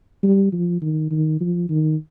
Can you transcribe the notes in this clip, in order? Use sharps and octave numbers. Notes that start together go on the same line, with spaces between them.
G3
F3
D#3
D#3
F3
D#3